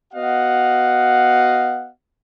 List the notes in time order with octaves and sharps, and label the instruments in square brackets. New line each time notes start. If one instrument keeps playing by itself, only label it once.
[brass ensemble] B3 F#4 D#5 F5 F#5